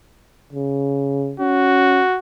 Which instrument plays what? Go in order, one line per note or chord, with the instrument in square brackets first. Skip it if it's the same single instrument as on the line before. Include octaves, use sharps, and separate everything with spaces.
[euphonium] C#3
[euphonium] C#4 [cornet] F#4